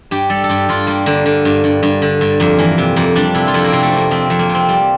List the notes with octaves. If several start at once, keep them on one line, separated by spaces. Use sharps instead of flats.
G2 G4
G3 A4
A4
G2 G4
G2 F4
G3 A#3
D3 A#3
D3
G2
G2
G2
D3
G2
F2 A#3
E3 A#3
C3
F2 A#3
G3 D4
C3 E4
F4
F2 E4
A#3 C4
C3
A3
C3 A#3
F2 C4
F2
A#3
C3
C4
G3